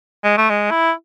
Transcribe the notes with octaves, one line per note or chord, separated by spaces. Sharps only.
G#3
A3
G#3
E4